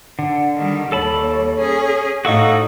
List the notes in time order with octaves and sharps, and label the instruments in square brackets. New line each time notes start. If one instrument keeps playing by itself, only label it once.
[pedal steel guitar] D3
[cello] D#3 G3
[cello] D#2 G3 [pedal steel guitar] A4 A5 B5 [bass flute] C#5
[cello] C#4 G#4
[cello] A2 D#4 [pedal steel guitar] F#4 A4 C#6 [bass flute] F5